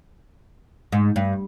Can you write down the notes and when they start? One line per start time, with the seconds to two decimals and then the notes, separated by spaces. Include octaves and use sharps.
0.92 G#2
1.16 G2